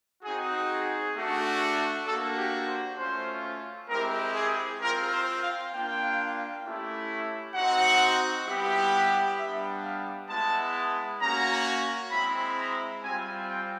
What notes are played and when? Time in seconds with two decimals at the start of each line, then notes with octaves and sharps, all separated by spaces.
0.23 C4 D#4 F#4 G#4
0.70 G#4
1.15 A3 D4 F#4
2.07 A#3 D4 F#4 A4
2.38 G4
2.67 C5
2.98 A3 C#4 F4 C5
3.89 G#3 C4 E4 G4 A#4
4.35 G#4
4.81 C4 F4 A#4
5.12 C5
5.42 F5
5.72 A#3 D4 F4 G5
6.64 A3 C#4 E4 G4
7.55 C4 D#4 F#4 F#5
8.47 G3 B3 E4 G4
9.38 G3 B3 D4 E5
9.83 F5
10.29 G#3 B3 E4 A5
11.21 A#3 C#4 F#4 A#5
12.12 G#3 C4 E4 B5
12.58 A#5
13.04 G3 C4 F4 G#5
13.49 G5